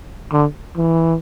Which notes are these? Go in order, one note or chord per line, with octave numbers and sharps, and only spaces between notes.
D3
E3